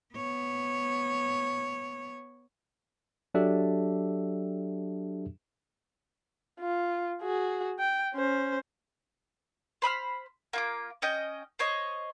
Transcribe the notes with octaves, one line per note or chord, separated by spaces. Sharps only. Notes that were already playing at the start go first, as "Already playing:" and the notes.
B3 C#5
F#3 D4 F#4 G4 A4 E5
F4
F#4 G#4
G5
C#4 C5
C5 B5 D#6 F6
A#3 F4 D6
C#4 D#5 G5
C5 C#5 D#5